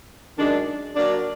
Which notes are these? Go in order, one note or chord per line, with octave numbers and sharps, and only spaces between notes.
F#2 D#3 G#3 D4
F#3 A#3 D4